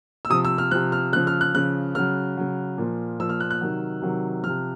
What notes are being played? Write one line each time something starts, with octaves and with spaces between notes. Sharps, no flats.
E6
C3 F3 D#6
E6
F6
C3 F3 F#6
F6
C#3 F3 F#6
F6
F#6
C#3 F3 F#6
C#3 F#3 F6
C#3 F#3
A#2 F3
A#2 F3 E6
F6
F#6
F#6
C3 D#3 F#3
C3 D#3 F#3
C3 F3 F6